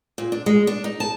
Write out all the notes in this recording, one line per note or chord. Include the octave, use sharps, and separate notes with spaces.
A#2
D4
G#3
D4
D#4
A5